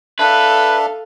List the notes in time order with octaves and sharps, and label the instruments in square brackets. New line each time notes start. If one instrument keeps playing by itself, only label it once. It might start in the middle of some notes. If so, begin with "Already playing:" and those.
[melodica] D4 E5 [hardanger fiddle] A4 F5 [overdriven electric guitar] B4